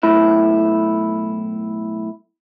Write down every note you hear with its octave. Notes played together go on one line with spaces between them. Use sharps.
B1 A2 E4